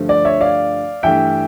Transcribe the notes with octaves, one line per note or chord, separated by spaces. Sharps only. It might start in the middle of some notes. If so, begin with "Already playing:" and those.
Already playing: G2 D3 F3 A3
D5
C#5 E5
D5 F5
G2 E3 A3 E5 G5